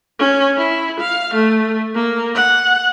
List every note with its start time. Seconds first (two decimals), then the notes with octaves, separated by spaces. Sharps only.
0.19 C#4
0.57 E4
1.00 F5
1.34 A3
1.95 A#3
2.35 F#5